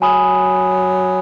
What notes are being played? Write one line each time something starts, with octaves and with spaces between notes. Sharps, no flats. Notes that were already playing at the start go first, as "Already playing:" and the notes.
F#3 G#5 B5 D#6